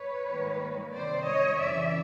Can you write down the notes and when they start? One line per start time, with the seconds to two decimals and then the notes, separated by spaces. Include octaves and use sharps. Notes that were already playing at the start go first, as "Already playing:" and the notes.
Already playing: B4 C#5
0.29 G#2 D#3 G3 A#3
0.94 C3 D#3 G3 C4 C5 D5
1.26 C#5 D#5
1.59 F2 C#3 E3 D5 E5